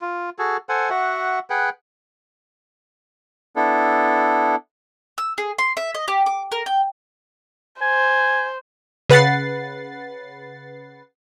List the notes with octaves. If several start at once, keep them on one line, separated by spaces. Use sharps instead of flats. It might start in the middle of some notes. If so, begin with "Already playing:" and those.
F4
F#4 G#4 A4
A4 C5 F#5 G#5
F#4 E5 F#5
G#4 B4 F#5 G5
B3 D4 E4 A4
E6
G#4
C6
E5
D#5
G4
D6
A#4
G5
C5 G#5
C#3 B4 F#5 A6 C7